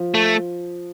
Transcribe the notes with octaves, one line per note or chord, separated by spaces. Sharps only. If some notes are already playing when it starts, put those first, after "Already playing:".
Already playing: F3
A3